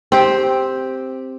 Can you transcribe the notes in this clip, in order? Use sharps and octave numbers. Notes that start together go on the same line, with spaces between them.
C4 G4